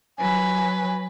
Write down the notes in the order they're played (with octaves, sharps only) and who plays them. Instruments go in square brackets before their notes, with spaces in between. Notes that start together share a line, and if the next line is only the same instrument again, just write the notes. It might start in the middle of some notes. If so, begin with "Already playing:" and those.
[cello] F#3 B4 [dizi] G#5